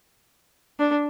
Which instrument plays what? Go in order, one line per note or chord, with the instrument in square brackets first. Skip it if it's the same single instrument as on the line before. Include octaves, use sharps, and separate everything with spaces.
[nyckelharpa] D4